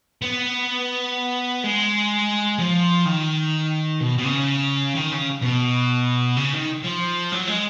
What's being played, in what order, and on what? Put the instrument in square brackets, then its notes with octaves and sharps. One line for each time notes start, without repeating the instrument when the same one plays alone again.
[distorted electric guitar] B3
G#3
F3
D#3
B2
B2
C#3
D#3
C#3
B2
C#3
D#3
F3
F#3
G#3